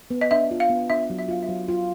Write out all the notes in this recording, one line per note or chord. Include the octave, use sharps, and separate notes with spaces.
B3
D#5
D4 E5
F4
F5
B3
D4 E5
F#3
E5
F4 F5
E5
F#3
F4